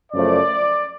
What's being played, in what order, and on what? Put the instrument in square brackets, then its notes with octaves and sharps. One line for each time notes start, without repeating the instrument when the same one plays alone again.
[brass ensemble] F#2 C#3 F3 A3 D5